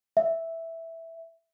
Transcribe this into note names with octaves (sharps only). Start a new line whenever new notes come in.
E5